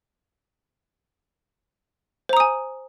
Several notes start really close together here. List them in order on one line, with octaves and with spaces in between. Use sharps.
C5 A#5 D#6 G#5